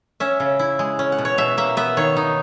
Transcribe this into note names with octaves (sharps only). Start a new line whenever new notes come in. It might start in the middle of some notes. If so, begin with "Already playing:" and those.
C#4 E5
C#3
E4
G#3
C#4
F#5
B2
C#5
B2 E5
A#3 E5
B3 E5
D#3 C#5
D#4